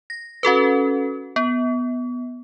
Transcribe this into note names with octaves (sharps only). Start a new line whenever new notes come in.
A#6
C#4 F#4 A4 B4
B3